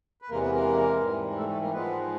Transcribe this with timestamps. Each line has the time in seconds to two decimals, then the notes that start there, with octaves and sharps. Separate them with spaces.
0.22 B4
0.30 E2 C3 E3 G#3 A#3 A#4
0.42 B3 B4
0.54 A#3 A#4
1.01 G#2 E3 G3
1.37 A3 A4
1.49 A3 A4
1.61 A#3 A#4
1.73 G#2 F3 G#3 B3 B4